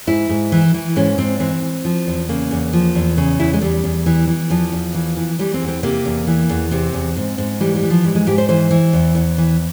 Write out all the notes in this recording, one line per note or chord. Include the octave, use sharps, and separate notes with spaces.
G#2 E4
G#2
E3
E3
G#2 C#4
G#2 C4
E3 C4
E3
F3
E2
C#3 A#3
E2
F3
E2
C#3
E2 E4
G#3
E2 G3
E2
E3
E3
E2 F3
E2
E3
E3
E3 G3
C4
E2
C4
C3 A#3
E2
E3
E2
C3 C4
E2
G#2
G#2
E3 G3
G3
E3
F3
G#2 G3
G#3
G#2 G4
C5
E3 C5
E3
E2
E2
E3